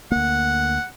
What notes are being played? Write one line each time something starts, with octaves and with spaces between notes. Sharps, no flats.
D2 A#3 F#5